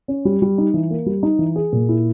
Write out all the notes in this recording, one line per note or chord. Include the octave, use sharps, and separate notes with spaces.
C#4
G3
G3
D#4
E3
A#3
G3
D#4
E3
G#4
A#2
E4